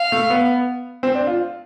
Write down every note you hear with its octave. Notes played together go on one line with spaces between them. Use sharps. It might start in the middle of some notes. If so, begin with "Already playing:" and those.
Already playing: F5
A3
B3
C4
D4
F4